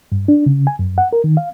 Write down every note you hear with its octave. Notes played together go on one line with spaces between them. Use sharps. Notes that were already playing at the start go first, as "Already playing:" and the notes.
G2
D4
C#3
G#5
F#2
F#5
A#4
D#3
F5